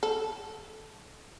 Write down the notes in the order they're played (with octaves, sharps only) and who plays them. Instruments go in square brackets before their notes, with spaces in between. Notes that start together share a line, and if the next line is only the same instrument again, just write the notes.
[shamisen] A4